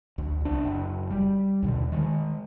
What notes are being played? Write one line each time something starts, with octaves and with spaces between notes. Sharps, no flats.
D2
C2 D4
F#1
G3
D#2 B2 D3
D#3 G3 G#3